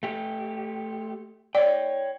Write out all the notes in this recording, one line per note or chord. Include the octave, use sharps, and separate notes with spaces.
A3 G4
C#5 D5 G5